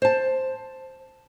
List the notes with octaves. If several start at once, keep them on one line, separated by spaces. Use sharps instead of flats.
C5 A5